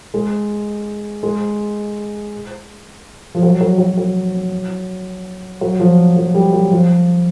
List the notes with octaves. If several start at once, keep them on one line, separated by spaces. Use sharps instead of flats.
G#3
G#3
F3
F#3
F#3
F#3
F#3
F#3
F3
F3
G3
F#3
F3